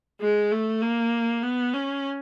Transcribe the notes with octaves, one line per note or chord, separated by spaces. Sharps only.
G#3
A3
A#3
B3
C#4